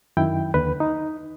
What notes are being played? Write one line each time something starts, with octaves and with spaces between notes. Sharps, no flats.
F#2 D#3 E4 G5
D#2 D3 B4
D#4